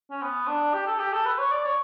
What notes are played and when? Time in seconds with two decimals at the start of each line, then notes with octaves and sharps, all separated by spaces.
0.11 C#4
0.22 B3
0.48 D4
0.74 G4
0.87 A4
0.99 G4
1.13 A4
1.25 B4
1.38 C#5
1.51 D5
1.64 C#5